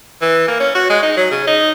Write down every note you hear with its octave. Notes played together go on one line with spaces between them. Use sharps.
E3
A#3
C#4
F#4
G#3
D#4
F#3
C#3
D#4